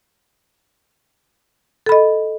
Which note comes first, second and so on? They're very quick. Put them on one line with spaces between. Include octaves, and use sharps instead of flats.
A4 B5 D#5